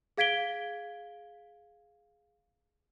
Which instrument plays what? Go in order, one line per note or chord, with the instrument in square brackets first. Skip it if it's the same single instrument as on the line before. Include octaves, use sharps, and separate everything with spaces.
[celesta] G#4 F5 G#6 B6 D7 G7